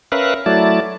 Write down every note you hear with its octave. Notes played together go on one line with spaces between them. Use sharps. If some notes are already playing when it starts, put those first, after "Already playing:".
C#4 A#4 B4 E5 F5 F#6
F#3 A3 E4 D5 A5